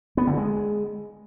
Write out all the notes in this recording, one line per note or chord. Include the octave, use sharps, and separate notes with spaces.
B3
D3
G#3